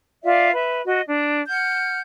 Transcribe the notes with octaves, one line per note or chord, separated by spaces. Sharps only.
F4 D5 E5 F5
B4 E5
F#4 D#5
D4
F#5 F6 G6